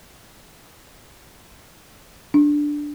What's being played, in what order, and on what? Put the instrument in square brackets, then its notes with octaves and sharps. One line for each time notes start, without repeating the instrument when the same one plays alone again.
[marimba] D4